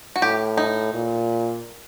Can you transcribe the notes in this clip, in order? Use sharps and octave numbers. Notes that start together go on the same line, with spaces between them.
F#4
A2 G4
D#4
A#2